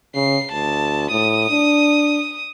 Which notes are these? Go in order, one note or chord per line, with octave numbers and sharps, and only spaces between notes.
C#3 C7
D2 A5
A2 D#6
D4